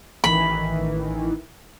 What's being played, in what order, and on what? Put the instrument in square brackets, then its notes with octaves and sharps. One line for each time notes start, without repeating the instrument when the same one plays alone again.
[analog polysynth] A1 D#3 E3 [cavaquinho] B5